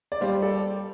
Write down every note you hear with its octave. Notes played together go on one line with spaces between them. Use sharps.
D5
G3 C5 F5
A4 D5